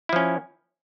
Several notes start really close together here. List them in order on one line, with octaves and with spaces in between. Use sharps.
E4 F3 C#4